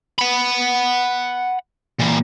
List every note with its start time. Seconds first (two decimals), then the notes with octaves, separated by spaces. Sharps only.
0.19 F#5 B5
2.00 A#2 E3